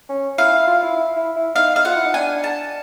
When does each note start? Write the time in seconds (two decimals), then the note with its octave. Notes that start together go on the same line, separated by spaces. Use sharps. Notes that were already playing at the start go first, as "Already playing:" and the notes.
0.09 C#4
0.38 E4 F5
0.52 E4
0.67 F4
0.83 E4
0.97 E4
1.16 E4
1.36 E4
1.55 D#4 F5
1.76 F5
1.85 F4 F#5
1.95 E4
2.05 D#4
2.14 D4 G#5
2.44 A5